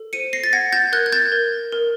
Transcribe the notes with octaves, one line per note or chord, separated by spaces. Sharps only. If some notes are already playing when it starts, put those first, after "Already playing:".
Already playing: A4
C5 C#7 D#7
A#6 C7
A6
F#5 G#6 A#6
G6 A6
A#4 F#6 G#6
G#6
G6 A6
A#4
A#4